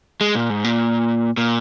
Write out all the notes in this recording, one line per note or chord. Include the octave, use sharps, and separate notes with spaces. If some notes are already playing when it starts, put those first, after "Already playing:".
G#3
A#2
G#2
A#2
A#2